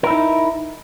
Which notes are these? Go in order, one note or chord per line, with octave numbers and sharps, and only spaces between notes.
D#4 E4 A#4